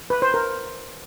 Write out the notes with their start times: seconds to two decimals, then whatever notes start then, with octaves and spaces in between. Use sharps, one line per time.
0.10 B4
0.22 C5
0.34 A#4